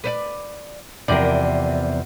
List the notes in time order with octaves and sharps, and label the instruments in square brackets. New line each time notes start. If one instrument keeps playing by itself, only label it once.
[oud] B4 C5 D5
[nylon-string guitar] E2 C3 F3 [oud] A#4 D5